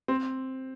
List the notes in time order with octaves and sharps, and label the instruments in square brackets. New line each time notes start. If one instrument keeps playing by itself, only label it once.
[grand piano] C4